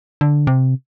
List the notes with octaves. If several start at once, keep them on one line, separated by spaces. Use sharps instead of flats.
D3
C3